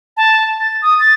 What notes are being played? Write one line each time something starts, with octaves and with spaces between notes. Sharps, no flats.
A5
A6
D#6
A6